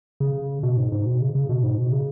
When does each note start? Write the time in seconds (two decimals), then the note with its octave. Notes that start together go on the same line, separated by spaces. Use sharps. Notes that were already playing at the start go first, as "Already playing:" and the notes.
0.20 C#3
0.63 B2
0.77 G#2
0.92 G#2
1.06 B2
1.21 C#3
1.35 C#3
1.49 B2
1.63 G#2
1.78 B2
1.91 C#3